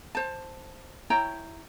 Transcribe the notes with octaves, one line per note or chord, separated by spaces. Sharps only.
C5 A5
E4 C#5 G5 A#5